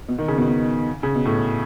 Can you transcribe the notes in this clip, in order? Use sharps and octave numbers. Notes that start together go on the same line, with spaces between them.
B2
D#3
C#3
B2
B2
C#3
B2
A2